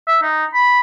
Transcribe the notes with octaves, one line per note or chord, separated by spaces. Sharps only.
E5
D#4
B5